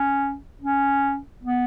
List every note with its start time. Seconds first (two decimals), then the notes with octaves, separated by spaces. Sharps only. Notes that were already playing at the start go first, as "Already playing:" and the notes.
Already playing: C#4
0.61 C#4
1.44 B3